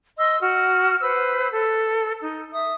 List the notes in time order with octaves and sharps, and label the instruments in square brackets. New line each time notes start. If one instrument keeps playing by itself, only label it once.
[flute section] D#5 C6 E6
F#4 F6
B4 C5 E6
A4
D#4
E5 D#6